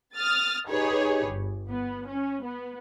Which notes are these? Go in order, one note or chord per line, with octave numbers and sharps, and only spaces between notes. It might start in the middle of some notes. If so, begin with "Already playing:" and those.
D#6 F6 A6
D#4 G4 G#4 B4 C#5
G1
B3
C#4
B3